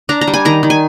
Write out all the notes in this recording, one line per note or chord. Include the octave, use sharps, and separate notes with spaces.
D4 A#5
A#5
G3
G#5
D#3 A#5
D#3
G#5